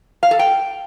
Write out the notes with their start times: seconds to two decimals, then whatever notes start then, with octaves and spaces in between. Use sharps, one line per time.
0.23 F5
0.31 A4
0.39 G5